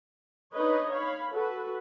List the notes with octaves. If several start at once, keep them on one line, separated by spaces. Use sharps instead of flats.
D4 D#4 B4 C#5 D#5
C#5 F5 B5
F#4 A4 B4